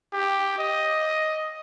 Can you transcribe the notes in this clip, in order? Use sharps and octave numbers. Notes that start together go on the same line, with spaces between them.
G4
D#5